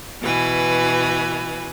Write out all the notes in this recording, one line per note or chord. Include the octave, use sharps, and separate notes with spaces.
B2 E3 B4 G#5